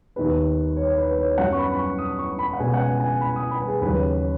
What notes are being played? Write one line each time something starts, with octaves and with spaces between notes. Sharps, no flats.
D#2 D#3 B3 B4
C#5
B4
B4
C#5
F#2 F#3 B3 F#5
C#6
B5
B5
C#6
D#6
C#6
B5
F#5
C#2 B2 B3 G#5
F#5
G#5
G#5
B5
D#6
B5
B4
G#4
D#2 C#3 F#3 C#4 B4